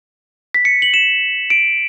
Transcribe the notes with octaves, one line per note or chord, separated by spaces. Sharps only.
B6
C#7
F#7
E7
D7